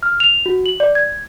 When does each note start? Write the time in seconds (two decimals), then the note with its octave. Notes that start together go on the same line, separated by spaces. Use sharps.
0.03 F6
0.20 F7
0.46 F#4
0.66 F#7
0.80 D5
0.95 G#6